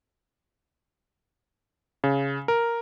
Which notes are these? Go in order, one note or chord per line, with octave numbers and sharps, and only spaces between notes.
C#3
A#4